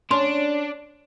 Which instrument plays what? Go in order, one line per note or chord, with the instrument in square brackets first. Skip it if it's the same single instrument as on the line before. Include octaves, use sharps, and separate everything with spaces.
[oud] C#4 [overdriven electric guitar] D4 [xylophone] C6